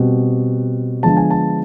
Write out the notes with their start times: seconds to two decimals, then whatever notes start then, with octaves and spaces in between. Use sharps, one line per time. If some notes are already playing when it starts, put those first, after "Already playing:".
Already playing: B2 G3 C4
1.03 D3 F3 G#3 B3 A5
1.17 G#5
1.30 A5